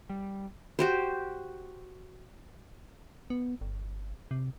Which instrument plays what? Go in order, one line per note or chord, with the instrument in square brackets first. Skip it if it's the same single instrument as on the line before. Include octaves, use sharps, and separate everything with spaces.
[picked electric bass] G3
[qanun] F#4 G4 C5
[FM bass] B3
G1
C3